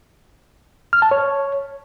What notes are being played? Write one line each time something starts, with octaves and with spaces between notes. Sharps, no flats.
F6
A5
C#5